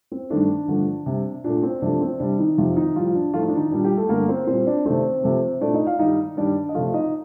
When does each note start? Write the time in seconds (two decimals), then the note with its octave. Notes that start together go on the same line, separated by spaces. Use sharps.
0.12 C4
0.30 G2 D#3 A3 D4
0.68 G2 D3 F3 A3
1.06 C3 G3
1.44 A#2 A3 D4
1.63 C4
1.82 C3 F3 A3 D4
2.01 C4
2.20 C3 G3 D4
2.39 D#3 D#4
2.58 F2 C3 D#3 F3 F4
2.76 D#3 D#4
2.95 A2 F3 G3 F4
3.15 D4
3.33 A2 F3 A3 F4
3.41 D#4
3.49 D4
3.56 D#3 D#4
3.71 A#2 G3 D4
3.84 G3 G4
3.97 A3 A4
4.09 G2 D3 A3 A#3 A#4
4.28 C4 C5
4.47 A#2 G3 C4 C5
4.66 D4 D5
4.85 C3 D#3 A3 C4 C5
5.23 C3 F3 A3
5.61 A#2 A3 D4 D5
5.74 D#4 D#5
5.87 F4 F5
5.99 G2 D#3 G3 D#4 D#5
6.37 G2 D#3 G3 D4 D5
6.69 D#5
6.74 C3 F3 A3 F4 F5
6.94 D#4 D#5